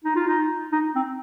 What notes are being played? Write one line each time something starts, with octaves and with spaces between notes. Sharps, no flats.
D#4
F4
D#4
D#4
C4